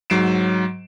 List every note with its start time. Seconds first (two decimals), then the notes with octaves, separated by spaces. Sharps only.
0.10 G#2 F#3 C7 D7 E7